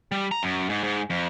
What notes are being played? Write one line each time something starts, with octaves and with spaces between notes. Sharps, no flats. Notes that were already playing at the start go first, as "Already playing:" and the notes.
G3
A#5
F#2
G#2
G#2
F2